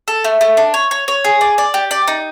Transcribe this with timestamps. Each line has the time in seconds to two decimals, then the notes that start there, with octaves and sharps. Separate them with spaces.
0.08 A4
0.24 A3
0.41 A3
0.57 D4
0.74 C#5
0.91 C#5
1.08 C#5
1.24 G#4
1.41 D5
1.58 D5
1.74 G4
1.91 D5
2.08 D#4